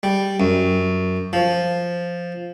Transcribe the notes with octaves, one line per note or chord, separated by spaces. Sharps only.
G3
F#2
F3